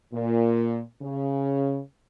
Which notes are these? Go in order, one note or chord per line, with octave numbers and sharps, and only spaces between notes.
A#2
C#3